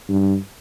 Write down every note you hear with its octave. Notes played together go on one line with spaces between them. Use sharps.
G2